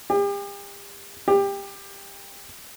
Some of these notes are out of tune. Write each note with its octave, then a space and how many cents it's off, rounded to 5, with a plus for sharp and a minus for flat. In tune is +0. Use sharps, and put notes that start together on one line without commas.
G4 +40
G4 +20